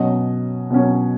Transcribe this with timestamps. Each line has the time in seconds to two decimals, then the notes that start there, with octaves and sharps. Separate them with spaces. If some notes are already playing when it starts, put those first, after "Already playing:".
Already playing: B2 F#3 C#4 D#5
0.70 B2 F#3 C#4